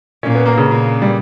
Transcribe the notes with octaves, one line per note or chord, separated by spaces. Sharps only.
A#2 C#4
B3
A#3
C#3
A#2
G3